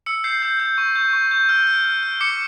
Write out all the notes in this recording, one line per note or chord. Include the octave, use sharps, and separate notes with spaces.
E6 C#7
G6 C7
G6
G6
C#6
G6
C#6
G6
F6
F6
F6
F6
D6 C#7